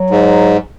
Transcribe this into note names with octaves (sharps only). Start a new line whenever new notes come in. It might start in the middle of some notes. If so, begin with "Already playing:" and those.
Already playing: F#3
G#2